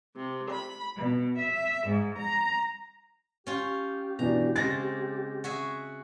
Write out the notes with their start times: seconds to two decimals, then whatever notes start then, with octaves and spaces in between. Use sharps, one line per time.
0.15 C3
0.49 B5
0.96 B2
1.37 E5
1.85 G#2
2.17 A#5
3.47 C#4 F4 G4
4.19 B2 E3 D4 A#5
4.56 C#3 G#3 C4 A6 A#6
5.44 F#4 G#4 E5